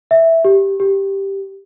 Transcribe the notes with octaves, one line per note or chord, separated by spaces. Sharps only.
E5
G4
G4